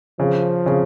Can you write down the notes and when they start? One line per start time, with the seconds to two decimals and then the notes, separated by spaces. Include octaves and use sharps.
0.19 C#3 F3
0.66 C#3